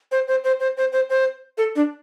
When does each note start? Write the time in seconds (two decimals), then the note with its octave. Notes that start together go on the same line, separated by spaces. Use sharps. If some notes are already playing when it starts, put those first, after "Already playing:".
0.12 C5
0.28 C5
0.44 C5
0.60 C5
0.77 C5
0.92 C5
1.10 C5
1.58 A4
1.76 D4